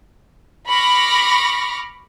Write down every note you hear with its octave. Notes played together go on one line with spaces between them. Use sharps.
B5 C#6 D6 F6 A#6